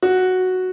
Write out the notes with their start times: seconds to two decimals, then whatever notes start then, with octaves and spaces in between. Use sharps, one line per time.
0.03 F#4